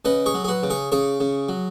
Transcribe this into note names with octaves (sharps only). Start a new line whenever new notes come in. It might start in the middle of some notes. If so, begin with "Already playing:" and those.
C#3 B4 D#5
G#4 C#5
F#3
G#4
F#4 B4
C#3
G#4 C#5
C#3 G#4 C#5
C#3
F#3